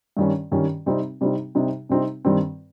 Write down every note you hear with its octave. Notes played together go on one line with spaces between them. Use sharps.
G2 D#3 G3 C#4
G2 D#3 G3 C#4
C3 G3 C4 D#4
C3 G3 C4 D#4
C3 G3 C4 D#4
C3 G3 C4 D#4
G2 D#3 G3 C4